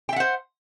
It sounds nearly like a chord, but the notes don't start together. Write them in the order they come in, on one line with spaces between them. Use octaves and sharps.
G5 E5 F#5 C5